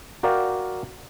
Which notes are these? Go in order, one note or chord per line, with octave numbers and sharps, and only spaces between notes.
F#4 A#4 D5 F5 G5